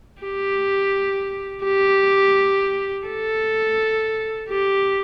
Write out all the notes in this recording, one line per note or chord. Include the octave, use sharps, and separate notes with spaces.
G4
G4
A4
G4